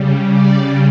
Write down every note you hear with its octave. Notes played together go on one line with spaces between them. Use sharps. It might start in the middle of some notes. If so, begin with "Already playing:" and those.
Already playing: C#3 G3
D5